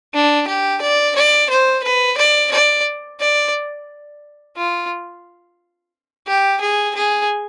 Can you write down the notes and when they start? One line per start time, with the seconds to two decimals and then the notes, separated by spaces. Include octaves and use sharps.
0.14 D4
0.47 G4
0.81 D5
1.16 D5
1.50 C5
1.83 B4
2.18 D5
2.51 D5
3.20 D5
4.57 F4
6.27 G4
6.61 G#4
6.95 G#4